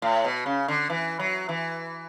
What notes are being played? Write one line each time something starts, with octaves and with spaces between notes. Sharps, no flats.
A2
B2
C#3
D3
E3
F#3
E3